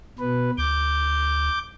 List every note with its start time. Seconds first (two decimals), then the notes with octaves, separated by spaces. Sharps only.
0.19 B2 B4
0.58 D2 D6 G6